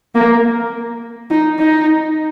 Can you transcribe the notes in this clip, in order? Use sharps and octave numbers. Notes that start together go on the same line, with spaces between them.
A#3
D#4
D#4